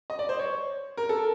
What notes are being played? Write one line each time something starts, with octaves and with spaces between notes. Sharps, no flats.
D#5
D5
C5
C#5
A#4
A4